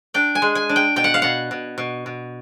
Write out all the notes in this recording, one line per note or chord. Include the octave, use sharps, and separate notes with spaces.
D4 G5
G#5
G#3
G#5
D4
G5
B2 G5
F#5
F5
B2 F#5
B2
B2
B2